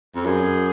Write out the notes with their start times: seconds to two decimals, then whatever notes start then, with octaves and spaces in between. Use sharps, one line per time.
0.15 F2
0.25 F#2 G#4